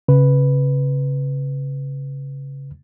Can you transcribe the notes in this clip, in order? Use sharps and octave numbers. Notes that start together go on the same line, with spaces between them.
C#3 B4